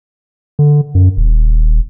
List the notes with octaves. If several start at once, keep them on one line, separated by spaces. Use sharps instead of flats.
D3
F#2
D#1